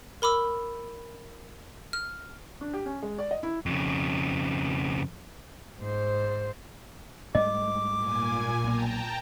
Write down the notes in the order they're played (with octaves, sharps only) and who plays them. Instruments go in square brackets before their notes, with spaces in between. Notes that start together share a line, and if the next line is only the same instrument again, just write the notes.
[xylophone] A#4 B5 D6 E6
F6
[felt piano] D4
G4
C#4
G#3
D5
D#5
E4
[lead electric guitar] F2 C#3
[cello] G#2 C5
[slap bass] G#2 G3 A3 [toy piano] D#5 [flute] D6
[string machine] A#2 G#5
[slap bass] B1 A#3 [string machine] G5 A5 A#5